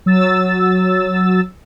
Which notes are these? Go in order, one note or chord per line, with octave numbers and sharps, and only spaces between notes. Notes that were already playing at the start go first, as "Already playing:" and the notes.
F#3 E6 A6